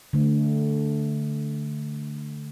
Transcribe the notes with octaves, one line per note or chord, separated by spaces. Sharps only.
D3 A3